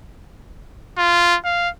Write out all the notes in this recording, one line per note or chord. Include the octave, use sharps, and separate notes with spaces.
F4
F5